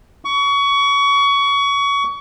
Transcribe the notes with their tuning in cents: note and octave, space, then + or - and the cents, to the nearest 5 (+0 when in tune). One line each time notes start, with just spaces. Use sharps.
C#6 +25